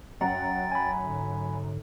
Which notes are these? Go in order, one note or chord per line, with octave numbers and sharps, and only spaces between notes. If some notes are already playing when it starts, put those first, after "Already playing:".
F#2 F#5 G5 A#5 A6
G#5 B5
G#2 D3